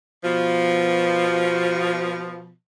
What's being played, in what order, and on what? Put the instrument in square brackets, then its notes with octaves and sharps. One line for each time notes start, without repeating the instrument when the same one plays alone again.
[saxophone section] B2 F3